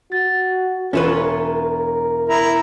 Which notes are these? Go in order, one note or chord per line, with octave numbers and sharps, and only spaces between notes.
F#4 A6
E1 C#4 F4 A#4 B4 C#5 E7
E4 A#5